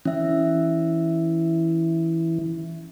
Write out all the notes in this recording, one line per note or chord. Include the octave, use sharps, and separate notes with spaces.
E3 C#4 E5